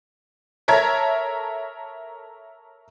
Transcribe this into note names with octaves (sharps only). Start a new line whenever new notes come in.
A4 A#4 C#5 E5 A#5 G#6